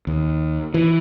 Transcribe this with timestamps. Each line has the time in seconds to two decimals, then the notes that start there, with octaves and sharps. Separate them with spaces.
0.07 D#2
0.74 E3